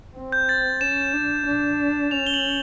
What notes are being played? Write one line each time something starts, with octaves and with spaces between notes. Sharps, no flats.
C4
G6
A6
C#4 E7
D4
D4
C#4 F7
G7
F#7